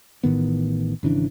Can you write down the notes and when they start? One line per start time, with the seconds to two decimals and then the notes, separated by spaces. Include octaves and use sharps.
0.23 A1 A2 D#3 B3
1.03 G#1 C#3 E3 D4